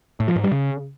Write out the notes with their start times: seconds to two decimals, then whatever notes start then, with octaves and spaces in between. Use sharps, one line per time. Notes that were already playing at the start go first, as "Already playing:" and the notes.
0.20 A2
0.28 F3
0.36 G#2
0.44 G3
0.52 C#3